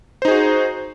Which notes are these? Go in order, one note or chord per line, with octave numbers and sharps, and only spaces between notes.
D#4 F#4 G#4 C5